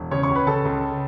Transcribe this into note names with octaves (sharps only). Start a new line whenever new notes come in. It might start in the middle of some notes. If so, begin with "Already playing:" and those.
Already playing: E1
C#3 C#5 C#6
C#5 C#6
C#2
B4 B5
C#3 A4 A5
C#2